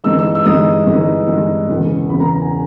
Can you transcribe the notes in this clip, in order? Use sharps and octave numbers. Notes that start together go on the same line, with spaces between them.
G2 E3 G#3 D#4 E6
E6
E6
G2 E3 G#3 D#4 D#6
G2 E3 G#3 D#4
G2 E3 G#3 D#4
E1 E2 C#3 E3
E1 E2 C#3 E3 B5
A#5
A#5
G#5